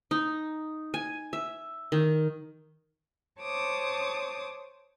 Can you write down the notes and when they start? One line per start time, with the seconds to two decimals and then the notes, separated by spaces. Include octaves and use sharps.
0.11 D#4
0.94 G#5
1.33 E5
1.92 D#3
3.40 C5 C#5 A5 D6 D#6